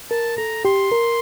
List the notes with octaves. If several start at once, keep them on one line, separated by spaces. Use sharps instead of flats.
A#4 A5
A4 A#5
G4 C6
A#4